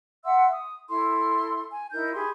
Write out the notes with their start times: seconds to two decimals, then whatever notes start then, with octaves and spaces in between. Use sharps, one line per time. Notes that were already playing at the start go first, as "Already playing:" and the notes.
0.24 E5 F#5 C6 E6
0.51 D#6
0.89 E4 A4 C6
1.71 G#5
1.93 D#4 E4 A#4 G6
2.14 G4 G#4 B5 C6